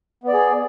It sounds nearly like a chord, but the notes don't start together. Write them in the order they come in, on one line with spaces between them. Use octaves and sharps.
B3 D5 G#4